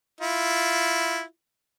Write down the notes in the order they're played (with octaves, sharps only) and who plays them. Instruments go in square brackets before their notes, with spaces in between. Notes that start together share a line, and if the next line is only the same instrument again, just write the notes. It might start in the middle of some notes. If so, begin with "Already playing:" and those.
[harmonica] E4 F4